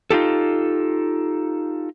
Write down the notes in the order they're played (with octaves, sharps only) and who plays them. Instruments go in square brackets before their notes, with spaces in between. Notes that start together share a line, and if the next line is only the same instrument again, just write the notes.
[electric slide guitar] D#4 F4 G4 A4